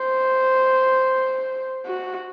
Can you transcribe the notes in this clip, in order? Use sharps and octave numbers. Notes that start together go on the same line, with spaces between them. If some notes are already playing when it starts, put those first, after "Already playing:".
Already playing: C5
F#4